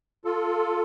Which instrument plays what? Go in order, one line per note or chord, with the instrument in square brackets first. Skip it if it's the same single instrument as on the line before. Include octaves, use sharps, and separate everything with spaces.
[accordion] F4 A4